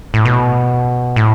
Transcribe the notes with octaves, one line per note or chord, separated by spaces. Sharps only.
A2
B2
A2